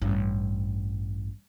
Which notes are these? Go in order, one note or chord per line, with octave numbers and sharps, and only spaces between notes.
A1 G2